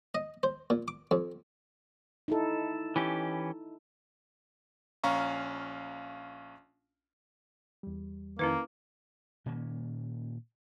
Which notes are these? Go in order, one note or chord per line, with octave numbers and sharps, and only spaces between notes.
D#5
C5
A#2
D6
F2
D#4 E4 A4
E3 C#4 G4
A#1 C#4 F5 A#5 C#6
E2 G3
F2 D#3 A#3 C#4 E4 B4
A#2 D#3 A#3 C#4